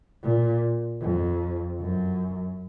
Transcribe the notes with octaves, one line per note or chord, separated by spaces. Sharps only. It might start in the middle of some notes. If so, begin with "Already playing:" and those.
A#2
F2
F#2